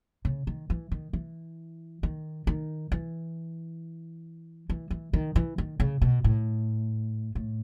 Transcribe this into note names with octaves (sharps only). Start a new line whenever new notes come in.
C#3
D#3
E3
D#3
E3
D#3
D#3
E3
E3
E3
D#3
E3
D#3
C#3
B2
A2
A2